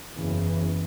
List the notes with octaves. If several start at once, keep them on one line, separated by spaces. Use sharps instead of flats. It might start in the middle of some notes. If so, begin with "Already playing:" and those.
F#1 E2 C#3 E3